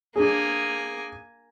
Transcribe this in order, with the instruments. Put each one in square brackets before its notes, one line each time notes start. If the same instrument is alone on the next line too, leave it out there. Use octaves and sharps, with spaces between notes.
[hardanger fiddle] A#3 G#5 [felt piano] D4 G#4